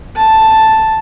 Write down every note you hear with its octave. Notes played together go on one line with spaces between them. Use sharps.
A5